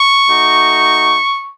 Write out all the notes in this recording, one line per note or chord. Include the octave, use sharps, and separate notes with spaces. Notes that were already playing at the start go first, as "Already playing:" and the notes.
Already playing: C#6
A3 D#4 F#4